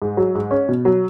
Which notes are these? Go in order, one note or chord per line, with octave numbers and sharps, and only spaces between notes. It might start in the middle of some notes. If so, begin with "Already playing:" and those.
G#2
F#3
G#2
C#4
B2
F#3